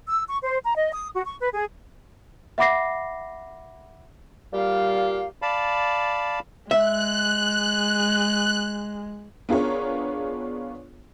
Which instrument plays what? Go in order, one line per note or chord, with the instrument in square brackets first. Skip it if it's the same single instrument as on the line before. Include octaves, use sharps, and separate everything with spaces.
[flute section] E6
C#6
C5
A#5
D#5
D#6
F#4
C#6
B4
G#4
[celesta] E5 F#5 B5 D6 A#6 C7
[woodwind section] A#2 G3 G4 F5
[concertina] D5 F5 A5 B5
[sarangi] G#3 [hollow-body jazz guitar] E5 [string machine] F#6
[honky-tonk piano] B3 D4 F4 G#4 A#4 C#5